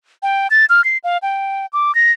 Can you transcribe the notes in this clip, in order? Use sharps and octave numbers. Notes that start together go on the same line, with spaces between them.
G5
A6
F6
C7
F5
G5
D6
A#6